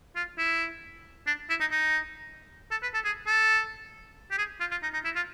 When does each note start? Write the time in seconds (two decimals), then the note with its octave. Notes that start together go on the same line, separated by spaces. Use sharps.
0.16 F4
0.38 E4
1.27 D4
1.50 E4
1.60 D#4
1.71 D#4
2.71 A4
2.83 B4
2.94 A4
3.05 G#4
3.27 A4
4.31 G4
4.38 G#4
4.60 F4
4.71 F4
4.83 D#4
4.94 D#4
5.05 E4
5.16 F4